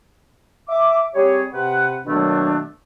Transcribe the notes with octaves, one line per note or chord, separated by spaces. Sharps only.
E5 D6
G3 C4 G4 G#4 C#5
C3 B4 F#5
B2 D#3 F#3 A3 A#3 D4